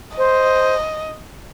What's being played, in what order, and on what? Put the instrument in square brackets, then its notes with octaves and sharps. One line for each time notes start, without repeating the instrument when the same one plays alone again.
[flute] C5 [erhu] D#5